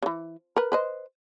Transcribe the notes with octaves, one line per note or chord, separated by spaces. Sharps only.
C#3 E3
A#4 B4
B4 C5 D#5